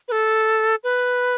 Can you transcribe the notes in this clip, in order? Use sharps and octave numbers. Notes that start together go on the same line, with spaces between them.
B4
A4
B4